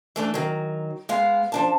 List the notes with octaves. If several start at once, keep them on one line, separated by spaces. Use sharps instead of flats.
E3 A3 D4
D#3 F#3
G#3 B3 F5
F3 D4 A5